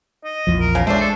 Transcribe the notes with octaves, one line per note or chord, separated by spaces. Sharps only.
D#5
A#1 E2 F3
A#4
C#3
G#3 A3 D4 C5
A4